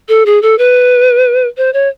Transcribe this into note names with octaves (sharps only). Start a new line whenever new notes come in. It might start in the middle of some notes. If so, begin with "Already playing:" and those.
A4
G#4
A4
B4
C5
C#5